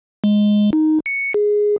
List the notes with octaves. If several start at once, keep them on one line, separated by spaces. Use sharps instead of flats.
G#3
D#4
C#7
G#4